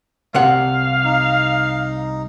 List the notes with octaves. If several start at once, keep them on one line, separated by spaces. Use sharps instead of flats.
C2 C3 F5 F#5
D#4